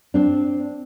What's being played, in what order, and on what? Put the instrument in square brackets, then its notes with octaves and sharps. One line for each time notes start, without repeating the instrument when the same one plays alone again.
[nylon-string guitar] C4 D4